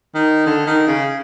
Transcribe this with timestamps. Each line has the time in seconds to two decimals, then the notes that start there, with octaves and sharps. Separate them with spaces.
0.15 D#3
0.46 D3
0.66 D#3
0.87 C#3